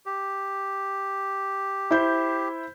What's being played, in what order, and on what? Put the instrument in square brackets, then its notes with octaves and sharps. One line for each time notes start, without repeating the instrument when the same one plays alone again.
[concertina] G4
[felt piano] E4 C5 G6